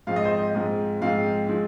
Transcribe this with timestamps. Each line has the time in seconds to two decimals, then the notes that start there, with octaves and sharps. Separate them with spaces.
0.07 G#2 F3 G#3 C4 F5
0.16 D#5
0.25 C5
0.35 D#5
0.55 G#2 F3 G#3 C4
1.01 G#2 F3 G#3 C4 F5
1.49 F3 G#3 C4